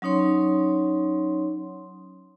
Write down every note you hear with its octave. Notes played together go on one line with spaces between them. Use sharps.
F#3 C#4 D#4 C#5 C6